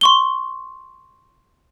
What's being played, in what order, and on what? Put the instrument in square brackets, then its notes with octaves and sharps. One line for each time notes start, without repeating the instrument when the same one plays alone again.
[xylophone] C6 C#6 G7